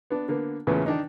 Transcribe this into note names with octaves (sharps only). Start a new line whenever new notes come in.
B3 D4
D3 A#3 B3
E2 A#2 C#3 A3 B3 C#4
D#3 D4 D#4